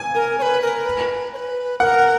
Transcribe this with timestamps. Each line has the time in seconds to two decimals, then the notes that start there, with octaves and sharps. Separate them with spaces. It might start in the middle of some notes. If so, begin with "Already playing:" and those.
Already playing: G#5
0.15 A#4
0.39 C#5
0.42 B4
0.62 A#4
0.85 B4
1.33 C#5
1.36 B4
1.80 A#4 F#5